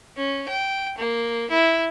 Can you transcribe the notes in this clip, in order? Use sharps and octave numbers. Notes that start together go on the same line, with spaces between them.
C#4
G5
A#3
E4